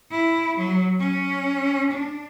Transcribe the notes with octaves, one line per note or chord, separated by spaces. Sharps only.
E4
F#3
C#4
D4